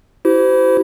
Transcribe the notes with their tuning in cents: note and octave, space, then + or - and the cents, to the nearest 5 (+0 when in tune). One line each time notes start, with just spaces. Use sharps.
E4 +0 G4 -40 C5 -30